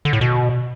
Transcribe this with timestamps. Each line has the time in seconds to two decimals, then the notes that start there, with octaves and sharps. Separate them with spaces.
0.05 D3
0.13 A2
0.21 B2